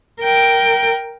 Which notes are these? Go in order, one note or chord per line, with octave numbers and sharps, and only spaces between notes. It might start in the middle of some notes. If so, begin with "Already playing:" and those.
A#4 G5